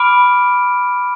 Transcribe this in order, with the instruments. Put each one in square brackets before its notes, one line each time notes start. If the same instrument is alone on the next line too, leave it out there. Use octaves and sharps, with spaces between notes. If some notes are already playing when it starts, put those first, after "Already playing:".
Already playing: [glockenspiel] B5 D6 F6 D7